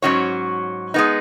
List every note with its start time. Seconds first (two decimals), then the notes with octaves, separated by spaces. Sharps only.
0.02 G#2 F#3 C#4 F#4 C#5
0.94 G#3 B3 D#4